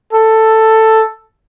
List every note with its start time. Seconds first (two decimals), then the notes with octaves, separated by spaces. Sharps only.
0.13 A4